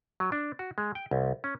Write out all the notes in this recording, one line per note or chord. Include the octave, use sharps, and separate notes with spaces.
F#3
D4
F#4
G#3
G5
C2
C#4